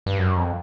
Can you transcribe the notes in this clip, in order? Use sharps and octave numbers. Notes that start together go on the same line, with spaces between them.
G2
F#2
F2